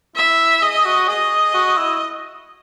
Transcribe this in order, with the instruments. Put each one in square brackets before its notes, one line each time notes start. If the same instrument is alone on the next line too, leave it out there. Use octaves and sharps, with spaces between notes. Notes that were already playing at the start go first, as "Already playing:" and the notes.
[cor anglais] E4 [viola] E5
[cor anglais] G#4 [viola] D#5
[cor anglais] F#4
[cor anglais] G#4 [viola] D#5
[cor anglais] F#4
E4